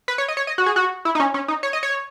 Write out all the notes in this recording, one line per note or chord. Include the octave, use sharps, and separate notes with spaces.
B4
C#5
D#5
C#5
D#5
F#4
G#4
F#4
E4
D#4
C#4
C#4
D#4
C#5
D#5
C#5